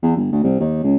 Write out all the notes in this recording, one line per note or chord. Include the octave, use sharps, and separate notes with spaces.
E2
G1
D2
C2
D#2
C#2